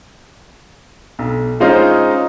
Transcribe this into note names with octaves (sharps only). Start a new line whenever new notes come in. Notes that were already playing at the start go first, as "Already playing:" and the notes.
B1
G#3 C#4 D#4 F4 C5 D#5